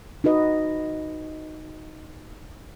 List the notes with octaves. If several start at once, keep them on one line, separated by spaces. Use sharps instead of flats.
D#4 F#4 B4 D#5